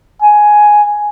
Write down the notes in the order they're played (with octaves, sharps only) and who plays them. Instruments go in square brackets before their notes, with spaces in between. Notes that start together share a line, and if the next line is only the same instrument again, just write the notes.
[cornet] G#5